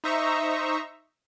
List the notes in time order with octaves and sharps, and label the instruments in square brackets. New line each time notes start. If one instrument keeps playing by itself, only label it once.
[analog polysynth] D#4 C5 E5 A#5 C#6